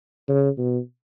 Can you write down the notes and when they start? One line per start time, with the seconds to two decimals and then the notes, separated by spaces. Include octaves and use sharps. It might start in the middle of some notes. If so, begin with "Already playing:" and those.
0.28 C#3
0.58 B2